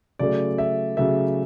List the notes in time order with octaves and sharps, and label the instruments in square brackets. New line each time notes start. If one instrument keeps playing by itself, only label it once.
[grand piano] C#3 F#3 A3 D5
E5
C#3 F#3 A3 E5